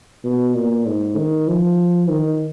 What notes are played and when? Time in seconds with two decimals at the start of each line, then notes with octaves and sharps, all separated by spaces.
0.24 B2
0.55 A#2
0.86 G#2
1.17 D#3
1.48 F3
2.09 D#3